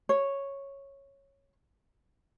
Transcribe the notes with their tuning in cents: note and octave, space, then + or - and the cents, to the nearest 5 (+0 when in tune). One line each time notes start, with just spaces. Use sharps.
C#5 -5